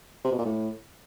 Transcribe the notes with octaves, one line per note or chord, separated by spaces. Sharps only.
C3
B2
A#2
A2